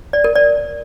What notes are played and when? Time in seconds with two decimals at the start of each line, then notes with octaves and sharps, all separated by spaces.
0.13 D5
0.24 A#4
0.35 D5